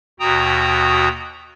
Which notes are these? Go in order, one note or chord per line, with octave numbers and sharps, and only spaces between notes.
D#2 B2 F#4 G5 A#5 D#6